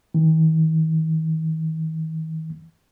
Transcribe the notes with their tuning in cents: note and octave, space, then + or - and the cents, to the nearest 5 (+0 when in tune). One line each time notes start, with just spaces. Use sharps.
D#3 +45